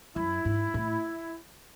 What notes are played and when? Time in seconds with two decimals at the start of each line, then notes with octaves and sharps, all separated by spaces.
0.16 F#2 E4
0.45 G#2
0.74 A2